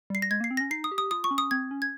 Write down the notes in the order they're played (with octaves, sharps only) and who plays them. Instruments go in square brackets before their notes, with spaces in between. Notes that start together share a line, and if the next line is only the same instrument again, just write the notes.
[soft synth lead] G3 [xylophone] C7
[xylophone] A#6
[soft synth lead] G#3 [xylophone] G#6
[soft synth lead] A#3 [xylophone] C7
[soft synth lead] C4
[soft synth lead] C#4 [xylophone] A#6
[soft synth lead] D#4 [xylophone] C7
[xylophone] D#6
[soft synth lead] G4
[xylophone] D#6
[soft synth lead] F4 [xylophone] D#6
[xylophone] C#6
[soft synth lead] C#4
[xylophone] D#6
[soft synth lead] C4 [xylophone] G#6
[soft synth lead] C#4
[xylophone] G#6